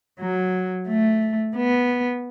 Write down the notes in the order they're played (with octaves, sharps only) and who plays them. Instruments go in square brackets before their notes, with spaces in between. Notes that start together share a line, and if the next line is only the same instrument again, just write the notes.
[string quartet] F#3
A3
B3